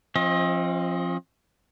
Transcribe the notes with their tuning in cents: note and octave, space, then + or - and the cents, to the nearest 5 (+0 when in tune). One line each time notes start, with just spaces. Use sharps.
F3 +0 C4 +40 D#5 +25